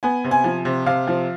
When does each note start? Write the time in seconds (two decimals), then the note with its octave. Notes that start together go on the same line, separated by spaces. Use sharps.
0.03 B3 G#5
0.24 C3
0.31 G#5
0.44 F3
0.65 C3
0.86 C3 F5
1.08 F3